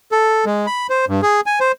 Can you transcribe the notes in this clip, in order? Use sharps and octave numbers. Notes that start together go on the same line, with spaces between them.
A4
G#3
B5
C5
G2
G#4
G#5
C5